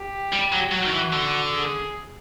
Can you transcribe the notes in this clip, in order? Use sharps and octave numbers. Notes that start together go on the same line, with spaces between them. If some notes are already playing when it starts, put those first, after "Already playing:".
Already playing: G4
G3
F#3
F#3 F#4
D#3
E3
D3
G#4